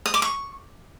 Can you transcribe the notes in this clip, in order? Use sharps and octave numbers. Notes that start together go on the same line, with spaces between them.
D#6
D6
C#6